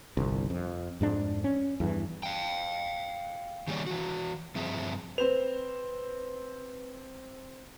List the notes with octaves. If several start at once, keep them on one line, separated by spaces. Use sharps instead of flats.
G1 C2
F2
F2 G#2 D4
C#4
E2 G2 E3
F5 G5
D#3 G3 A#3 G#4 C#5 D5
E3 F#4
G2 F3 C4 G#4 E5
C4 B4 C5 F7